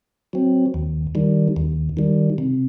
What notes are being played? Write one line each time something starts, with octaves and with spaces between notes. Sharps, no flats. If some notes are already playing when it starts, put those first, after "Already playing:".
F#3 C4
D#2
D#3 G3
D#2
D#3 G3
C3